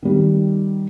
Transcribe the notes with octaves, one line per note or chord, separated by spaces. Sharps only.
D#3 G3